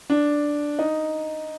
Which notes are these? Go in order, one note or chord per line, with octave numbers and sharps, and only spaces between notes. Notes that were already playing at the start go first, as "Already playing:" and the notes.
D4
D#4